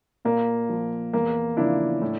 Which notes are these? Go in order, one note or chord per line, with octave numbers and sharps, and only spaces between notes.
A#2 A#3
F3
E2 A#3
C#3 F3 D4 E4
A2